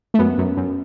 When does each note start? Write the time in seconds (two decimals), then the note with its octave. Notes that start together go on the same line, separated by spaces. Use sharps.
0.14 A3
0.19 F#2 B3
0.38 F#2
0.57 F#2